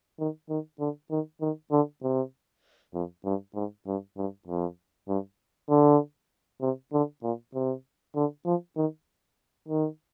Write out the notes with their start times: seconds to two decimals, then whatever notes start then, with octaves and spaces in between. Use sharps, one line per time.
0.19 D#3
0.49 D#3
0.80 D3
1.11 D#3
1.41 D#3
1.72 D3
2.03 C3
2.94 F2
3.25 G2
3.55 G#2
3.87 G2
4.17 G2
4.47 F2
5.08 G2
5.70 D3
6.62 C3
6.93 D3
7.23 A#2
7.54 C3
8.16 D3
8.45 F3
8.77 D#3
9.68 D#3